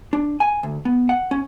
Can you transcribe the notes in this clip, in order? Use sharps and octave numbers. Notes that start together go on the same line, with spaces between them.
D4
G#5
D2
B3
F#5
C#4